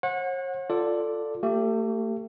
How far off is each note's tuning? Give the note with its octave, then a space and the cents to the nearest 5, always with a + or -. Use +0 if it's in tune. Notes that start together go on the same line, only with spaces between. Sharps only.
C#5 -45 F#5 -25
F4 +0 A4 +10 D5 +0
A3 +35 G4 +0